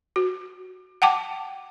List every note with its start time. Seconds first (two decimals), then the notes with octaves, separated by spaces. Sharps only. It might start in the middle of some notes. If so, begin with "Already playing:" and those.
0.16 F#4
1.02 F#5 G5 A5 D6